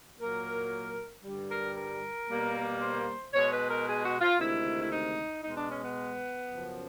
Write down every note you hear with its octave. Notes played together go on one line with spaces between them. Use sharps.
A#2 F#3 A#3 A#4
G2 D3 G3
A#4
A#4
B2 G3 A#3
C5
B2 G#3 C#5
B4
A#4
G#4
F#4
F4
D2 C3 D#3 G#3 E4
E4
D#4
B2 G#3 D#4
D4
C#4
B3
F#2 C#3 F3